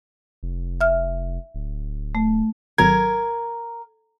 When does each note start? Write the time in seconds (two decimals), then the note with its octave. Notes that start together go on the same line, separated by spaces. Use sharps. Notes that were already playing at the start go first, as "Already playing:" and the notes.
0.43 F1
0.81 E5 F6
1.55 D1
2.15 A3
2.78 G#1 F#3 A#4 G#6